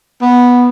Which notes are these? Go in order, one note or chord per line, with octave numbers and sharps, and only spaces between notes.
B3